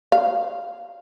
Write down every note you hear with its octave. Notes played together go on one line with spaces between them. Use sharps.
F5